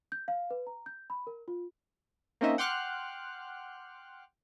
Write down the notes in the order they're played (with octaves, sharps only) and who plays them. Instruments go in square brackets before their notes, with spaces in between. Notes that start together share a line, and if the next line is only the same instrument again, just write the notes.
[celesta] G6
F5
B4
A#5
G6
B5
A#4
F4
[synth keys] A#3 C4 C#4 D#4 D#5 E5
F#5 G5 C6 D6 F6 F#6